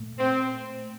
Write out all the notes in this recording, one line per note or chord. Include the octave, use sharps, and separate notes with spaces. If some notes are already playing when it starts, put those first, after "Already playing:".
Already playing: A#2 A3
C4